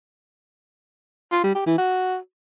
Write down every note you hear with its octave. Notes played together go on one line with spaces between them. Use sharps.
F4
G3
G4
E3
F#4